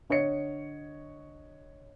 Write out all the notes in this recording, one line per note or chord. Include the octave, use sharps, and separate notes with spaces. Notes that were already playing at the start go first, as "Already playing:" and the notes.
D3 C#5 D#5 C#7